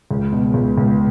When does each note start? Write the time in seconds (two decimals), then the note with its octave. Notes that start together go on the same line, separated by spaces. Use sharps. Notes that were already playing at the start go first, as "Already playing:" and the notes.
0.11 C#2
0.32 B2
0.54 C#2
0.78 C#2